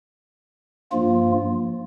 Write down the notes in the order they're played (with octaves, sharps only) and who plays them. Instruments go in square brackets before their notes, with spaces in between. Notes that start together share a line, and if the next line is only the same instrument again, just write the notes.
[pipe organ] G2 F3 A#3 F4